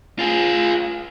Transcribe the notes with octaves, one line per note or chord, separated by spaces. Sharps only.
F4 G#4